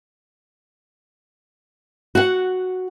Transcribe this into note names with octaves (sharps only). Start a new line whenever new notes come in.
F#4 F#5